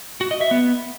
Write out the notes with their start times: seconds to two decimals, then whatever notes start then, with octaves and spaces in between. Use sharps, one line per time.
0.21 F#4
0.31 D#5
0.41 E5
0.51 B3